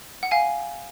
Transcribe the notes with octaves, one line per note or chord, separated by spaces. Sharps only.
F#5
F5 G#5